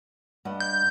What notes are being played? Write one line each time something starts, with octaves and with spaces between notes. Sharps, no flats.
G2 D#5 F#5
G6